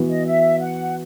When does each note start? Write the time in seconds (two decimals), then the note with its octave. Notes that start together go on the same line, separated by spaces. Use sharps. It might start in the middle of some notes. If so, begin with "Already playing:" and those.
Already playing: E3 B3 F#4 B4
0.09 D#5
0.26 E5
0.59 F#5